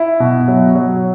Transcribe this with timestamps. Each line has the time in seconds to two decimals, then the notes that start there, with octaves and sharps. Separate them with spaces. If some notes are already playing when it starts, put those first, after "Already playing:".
Already playing: E4
0.20 B2
0.48 F#3
0.75 F#3